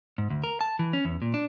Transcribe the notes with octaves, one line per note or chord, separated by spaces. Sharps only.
G#2
D2
A#4
A5
E3
C#4
E2
A#2
D4